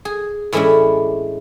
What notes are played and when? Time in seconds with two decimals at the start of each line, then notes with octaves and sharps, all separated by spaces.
0.05 G#4
0.52 A2 E3 G#3 C#4 D4 E4